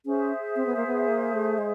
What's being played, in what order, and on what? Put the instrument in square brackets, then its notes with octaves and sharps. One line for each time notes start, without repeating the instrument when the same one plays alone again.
[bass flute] C#4 [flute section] G#4 C5 E5
[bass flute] C4
B3
A#3
B3
A#3
A3
G#3